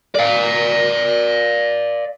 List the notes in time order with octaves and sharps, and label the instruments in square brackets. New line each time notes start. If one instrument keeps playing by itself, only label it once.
[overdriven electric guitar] D5 F5